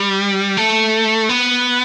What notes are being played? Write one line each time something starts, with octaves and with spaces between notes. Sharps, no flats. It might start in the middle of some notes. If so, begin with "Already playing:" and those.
Already playing: G3
A3
B3